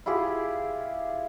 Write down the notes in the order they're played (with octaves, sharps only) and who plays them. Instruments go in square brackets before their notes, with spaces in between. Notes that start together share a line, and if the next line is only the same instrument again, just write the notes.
[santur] E4 F4 G4 G#4